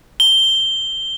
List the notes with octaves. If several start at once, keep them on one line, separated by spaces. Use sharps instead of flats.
G7